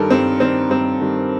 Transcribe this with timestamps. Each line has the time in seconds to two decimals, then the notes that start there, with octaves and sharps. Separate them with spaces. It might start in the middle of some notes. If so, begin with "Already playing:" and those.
Already playing: G2 D#3 G3 A4 A#4
0.10 G2 C4
0.40 D#3 G3 C4
0.70 G2 C4
1.00 D#3 G3